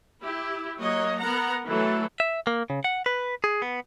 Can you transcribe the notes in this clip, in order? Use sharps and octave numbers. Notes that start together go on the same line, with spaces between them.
E4 G4
F#3 A#3 C#5 D#5
B3 A#4 F#5 A#5
E3 F#3 A3 A4
E5
A#3
C#3
F#5
B4
G#4
B3